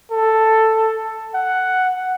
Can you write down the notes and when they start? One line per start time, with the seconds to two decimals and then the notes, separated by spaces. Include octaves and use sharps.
0.11 A4
1.35 F#5